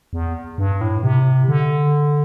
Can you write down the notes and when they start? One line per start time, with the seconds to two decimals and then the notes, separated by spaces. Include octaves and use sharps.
0.13 E2
0.58 G2
0.81 A2
1.03 C3
1.48 D3